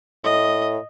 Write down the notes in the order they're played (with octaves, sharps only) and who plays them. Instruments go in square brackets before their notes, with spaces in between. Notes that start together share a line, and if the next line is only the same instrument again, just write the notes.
[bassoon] A2 [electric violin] D#5